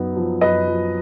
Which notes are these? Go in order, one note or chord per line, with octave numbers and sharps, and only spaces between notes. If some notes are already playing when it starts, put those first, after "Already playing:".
Already playing: F#2 B3 D#4
F3
F#2 B4 D#5
F3